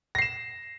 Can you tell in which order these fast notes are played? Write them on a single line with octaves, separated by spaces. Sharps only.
A#6 C7 E7